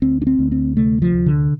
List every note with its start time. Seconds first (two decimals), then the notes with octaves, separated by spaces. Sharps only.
0.02 D2 C4
0.22 D4
0.27 C4
0.39 D2
0.52 C4
0.77 C3 A3
1.02 F3
1.14 D2
1.26 D3